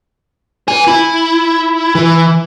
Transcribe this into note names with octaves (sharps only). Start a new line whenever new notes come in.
B4 G#5
E4
E3